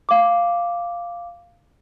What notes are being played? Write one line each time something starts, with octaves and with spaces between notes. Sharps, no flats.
F5 D6